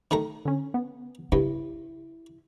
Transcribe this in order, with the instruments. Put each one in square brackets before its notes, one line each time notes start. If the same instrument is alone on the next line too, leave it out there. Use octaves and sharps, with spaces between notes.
[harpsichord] D#3 A3 A#5
[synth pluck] D3 C#4
B3
[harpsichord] G2 [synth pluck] C#3 [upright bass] E4